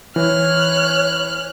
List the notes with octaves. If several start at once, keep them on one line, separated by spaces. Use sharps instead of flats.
E3 C#5 F6 F#6